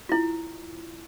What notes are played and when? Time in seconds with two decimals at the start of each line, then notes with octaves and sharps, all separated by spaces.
0.09 E4 F4